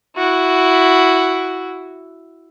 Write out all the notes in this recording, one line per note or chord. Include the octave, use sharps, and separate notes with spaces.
E4 F#4